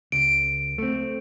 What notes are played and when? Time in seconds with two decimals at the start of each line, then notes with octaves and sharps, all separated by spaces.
0.12 C#2 D7
0.78 A3 C4